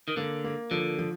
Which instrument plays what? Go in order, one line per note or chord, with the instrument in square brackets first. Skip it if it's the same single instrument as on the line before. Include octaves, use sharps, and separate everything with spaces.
[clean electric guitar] D#3
[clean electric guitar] D3 [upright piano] A#3
[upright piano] A#3
[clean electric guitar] D3 [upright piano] F3
[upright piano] F3